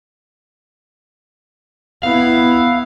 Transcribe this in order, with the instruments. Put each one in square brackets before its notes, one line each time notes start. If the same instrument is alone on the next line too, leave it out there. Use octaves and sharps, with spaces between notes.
[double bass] B3 E4 [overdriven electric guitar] F5